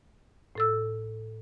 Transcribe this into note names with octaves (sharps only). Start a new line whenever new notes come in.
A2 A4 E6